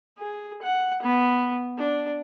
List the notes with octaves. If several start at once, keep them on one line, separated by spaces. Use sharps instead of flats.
G#4
F#5
B3
D4